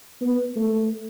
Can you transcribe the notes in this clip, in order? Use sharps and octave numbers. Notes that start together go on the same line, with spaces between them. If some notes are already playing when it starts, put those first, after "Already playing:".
B3
A3